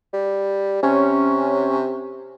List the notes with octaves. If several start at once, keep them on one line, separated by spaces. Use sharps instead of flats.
G3
C3 C#4